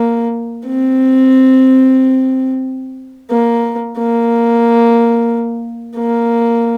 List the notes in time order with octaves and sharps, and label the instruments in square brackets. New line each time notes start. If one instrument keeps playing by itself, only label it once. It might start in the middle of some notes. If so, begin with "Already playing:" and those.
Already playing: [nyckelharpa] A#3
C4
A#3
A#3
A#3